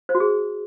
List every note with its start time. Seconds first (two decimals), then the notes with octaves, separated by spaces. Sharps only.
0.09 C5
0.15 F#4
0.20 G#4